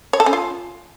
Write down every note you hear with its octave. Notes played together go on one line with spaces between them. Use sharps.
C#5
A4
C#4
F4